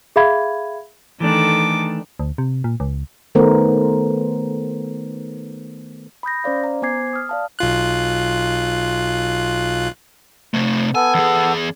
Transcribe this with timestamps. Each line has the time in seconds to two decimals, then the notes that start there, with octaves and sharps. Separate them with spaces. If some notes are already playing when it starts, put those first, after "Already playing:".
0.16 G#4 E5 F5 B5 G#6
1.20 D#3 E3 A3 D4 A4 D6
2.19 D2
2.38 C3
2.64 A#2
2.80 C#2
3.35 D#3 A3 B3 A#4 C5
6.23 B5 D#6 G6 A#6
6.44 C#4 C5 D5 F5
6.64 A#5
6.82 B3 C5 G#5 D6 G#6 C7
7.13 D#6 F6
7.29 D5 F5 A5
7.59 B1 F4 F#6
10.54 C3 A3
10.95 B3 A4 G#5
11.14 E2 G#4